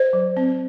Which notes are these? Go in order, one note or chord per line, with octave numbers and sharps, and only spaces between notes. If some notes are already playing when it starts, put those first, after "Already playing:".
Already playing: C5 D#5
F#3
C4